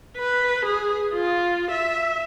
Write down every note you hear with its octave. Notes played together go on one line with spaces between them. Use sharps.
B4
G#4
F4
E5